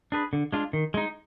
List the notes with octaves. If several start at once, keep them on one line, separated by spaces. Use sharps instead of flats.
D4 G#4 B4
D3
G#3 D4 F4
D#3
G#3 D#4